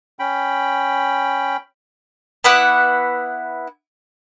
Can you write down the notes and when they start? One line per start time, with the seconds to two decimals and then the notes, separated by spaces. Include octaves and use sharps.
0.19 C#4 G5 B5
2.44 B3 E4 F#5 D6